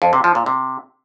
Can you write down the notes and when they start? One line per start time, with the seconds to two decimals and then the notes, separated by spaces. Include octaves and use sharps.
0.02 F2
0.13 C3
0.24 F3
0.35 A#2
0.46 C3